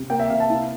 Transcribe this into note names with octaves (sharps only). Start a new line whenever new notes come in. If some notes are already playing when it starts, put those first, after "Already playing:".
Already playing: C3
A#3 G5
E5
C3 F5
A5
E4